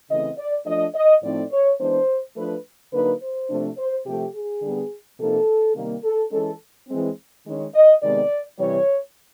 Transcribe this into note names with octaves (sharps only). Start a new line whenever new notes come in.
C#3 E3 A3 C4 D#5
D5
F3 A3 D4 D#5
D#5
A2 F3 A3 C4 D#4 D5
C#5
E3 G#3 B3 D4 C5
F3 A3 D4 B4
D3 F#3 A#3 D#4 B4
C5
C3 F3 A3 D4
C5
C3 F3 A3 G4
G#4
D3 G3 B3
C3 F3 A#3 D#4 A4
C3 D#3 G3 A#3
A4
E3 G#3 C#4 A4
E3 G#3 C4
D#3 G#3 C#4
D#5
C3 D#3 G#3 B3 D5
C3 E3 G3 C#5